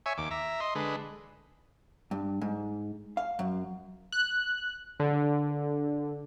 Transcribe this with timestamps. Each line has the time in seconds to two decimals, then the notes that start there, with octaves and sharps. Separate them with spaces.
0.06 C#5 E5 G#5
0.18 D#2 D6
0.31 E5 A#5
0.60 D#5 C6
0.75 D3 G#3 B4
2.11 G2
2.41 G#2
3.17 F5
3.39 F#2
4.12 F#6
5.00 D3